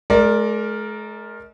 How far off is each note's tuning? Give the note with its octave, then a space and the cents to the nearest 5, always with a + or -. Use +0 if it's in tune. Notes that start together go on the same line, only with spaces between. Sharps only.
G#3 +45 A#4 +0 D5 -5